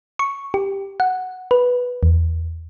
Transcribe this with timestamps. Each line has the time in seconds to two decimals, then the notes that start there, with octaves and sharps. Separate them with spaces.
0.19 C#6
0.54 G4
1.00 F#5
1.51 B4
2.03 E2